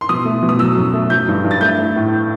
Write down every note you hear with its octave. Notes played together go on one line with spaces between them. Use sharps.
C6
B2 D#6
A3
B2
D#6
F#3 E6
F#2
A3
F#3 G6
G2
G2
A6
A3 G6
A3
A2